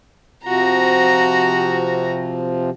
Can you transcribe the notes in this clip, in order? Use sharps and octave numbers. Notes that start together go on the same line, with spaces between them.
C3 F3 F#4 A#5